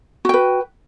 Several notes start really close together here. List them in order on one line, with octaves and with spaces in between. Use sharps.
F#4 G5 B4